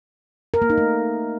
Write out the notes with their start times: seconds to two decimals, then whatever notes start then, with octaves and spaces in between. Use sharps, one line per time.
0.54 A#4
0.62 A#3
0.70 D#4
0.78 A3